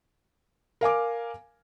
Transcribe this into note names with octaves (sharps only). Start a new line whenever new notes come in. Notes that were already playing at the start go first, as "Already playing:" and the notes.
A#4 F5 G#5 D6